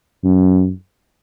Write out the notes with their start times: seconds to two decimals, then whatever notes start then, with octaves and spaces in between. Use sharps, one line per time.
0.24 F#2